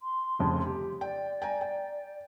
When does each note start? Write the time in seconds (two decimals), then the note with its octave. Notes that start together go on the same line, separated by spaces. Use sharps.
0.01 C6
0.39 F1 F2 C#3
0.66 G4
1.01 D5 G5
1.42 G5 G#5 A#5
1.61 G5